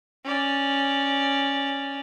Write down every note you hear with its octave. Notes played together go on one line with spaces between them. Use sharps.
C#4 D5